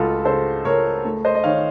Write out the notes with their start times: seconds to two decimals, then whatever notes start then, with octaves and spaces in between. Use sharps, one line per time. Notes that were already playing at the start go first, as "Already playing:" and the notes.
Already playing: C#2 A3 F4 F#4 A4
0.25 C#3 A4 C5
0.65 C#2 A#4 C#5
1.05 A3
1.25 C5 D#5
1.35 D#5
1.44 D#3 C#5 F5